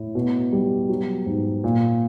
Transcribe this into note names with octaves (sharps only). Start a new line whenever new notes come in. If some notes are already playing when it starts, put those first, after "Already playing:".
Already playing: A2
B2
G3
F#3
G#2
A#2